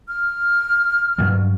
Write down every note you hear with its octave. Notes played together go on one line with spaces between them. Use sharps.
F6
G2 F#3 G3